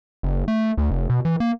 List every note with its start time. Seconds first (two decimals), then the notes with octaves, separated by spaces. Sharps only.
0.23 F#1
0.48 A3
0.78 D2
0.91 F1
1.10 B2
1.25 E3
1.40 A#3